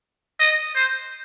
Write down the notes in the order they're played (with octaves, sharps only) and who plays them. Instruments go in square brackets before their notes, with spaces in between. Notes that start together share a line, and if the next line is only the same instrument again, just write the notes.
[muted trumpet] D#5
C5